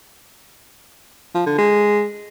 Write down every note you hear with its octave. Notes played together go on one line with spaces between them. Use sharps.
F3
D3
G#3